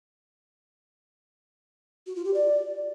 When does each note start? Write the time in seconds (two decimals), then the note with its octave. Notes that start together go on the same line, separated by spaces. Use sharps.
2.07 F#4
2.16 F4
2.25 G4
2.34 D5